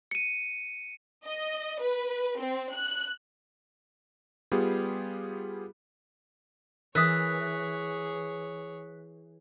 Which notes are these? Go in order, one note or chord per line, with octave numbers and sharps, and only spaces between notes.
C#7 D#7
D#5
B4
C4
F#6
G3 B3 F4 G4 G#4
E3 G#4 A#4 C#5 D#5 D#6 F#6 B6